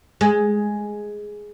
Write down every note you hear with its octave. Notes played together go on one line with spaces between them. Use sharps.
G#3